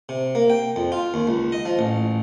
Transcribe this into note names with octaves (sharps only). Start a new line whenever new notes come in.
C3
A#3
G5
F2
F4
D#2
C#2
D#5
F3
A1